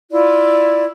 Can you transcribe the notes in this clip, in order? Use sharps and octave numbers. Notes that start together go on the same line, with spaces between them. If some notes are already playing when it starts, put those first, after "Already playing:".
E4 F4 D5